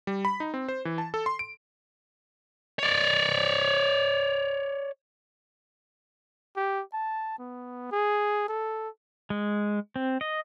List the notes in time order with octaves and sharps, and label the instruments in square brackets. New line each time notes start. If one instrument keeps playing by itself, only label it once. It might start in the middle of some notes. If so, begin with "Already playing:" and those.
[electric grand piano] G3
B5
D#4
C4
C5
E3
A5
A4
C6
D7
[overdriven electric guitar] C#5 D5
[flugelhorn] G4
A5
B3
G#4
A4
[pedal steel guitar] G#3
C4
D#5